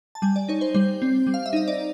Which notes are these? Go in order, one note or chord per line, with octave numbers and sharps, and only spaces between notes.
A5
G3 G#5
D5
D#4 C#5
C5
G3 C5
C4
G3
F5
E5
D#4 D#5
D5